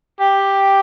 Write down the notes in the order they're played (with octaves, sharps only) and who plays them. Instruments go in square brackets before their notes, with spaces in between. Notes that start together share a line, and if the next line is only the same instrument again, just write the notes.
[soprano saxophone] G4